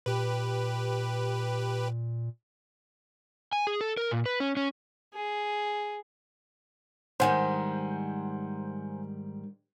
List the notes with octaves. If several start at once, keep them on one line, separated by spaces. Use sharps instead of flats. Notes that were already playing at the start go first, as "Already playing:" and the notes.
A#2 G4 B4
G#5
G#4
A4
A#4
A#2
B4
C#4
C#4
G#4
G#2 D#3 G3 C5 F#5 G#5